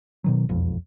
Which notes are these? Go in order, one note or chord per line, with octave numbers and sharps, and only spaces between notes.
B2 D#3 F#3
E1 B1 F2